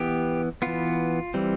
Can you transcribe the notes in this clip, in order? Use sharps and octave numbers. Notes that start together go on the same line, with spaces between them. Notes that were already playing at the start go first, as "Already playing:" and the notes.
Already playing: E3 B3 G4
E3 B3 F4
E3 G3 C4